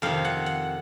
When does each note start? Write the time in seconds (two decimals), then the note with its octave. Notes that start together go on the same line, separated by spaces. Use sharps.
0.02 F2 C3 D#3 F5
0.25 F#5
0.46 F#5